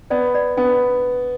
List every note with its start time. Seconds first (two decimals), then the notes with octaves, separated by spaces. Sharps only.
0.10 B3 D5
0.35 D5
0.57 B3 D4